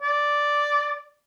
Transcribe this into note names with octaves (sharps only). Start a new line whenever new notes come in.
D5